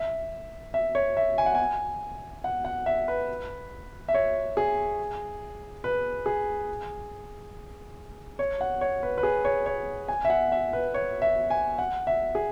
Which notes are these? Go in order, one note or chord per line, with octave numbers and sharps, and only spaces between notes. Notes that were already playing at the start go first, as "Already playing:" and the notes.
Already playing: E5
E5
C#5
E5
G#5
F#5
G#5
F#5
F#5
E5
B4
E5
C#5
G#4
B4
G#4
C#5
F#5
C#5
B4
B4
G#4
C#5
C#5
G#5
E5
F#5
E5
B4
C#5
E5
G#5
F#5
E5
G#4